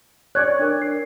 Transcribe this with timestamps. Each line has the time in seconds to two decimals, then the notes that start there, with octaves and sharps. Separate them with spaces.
0.35 C#5 D5 F#6 G#6
0.59 D4 A#4
0.82 C7